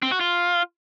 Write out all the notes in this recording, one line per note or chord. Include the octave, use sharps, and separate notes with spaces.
C4
F#4
F4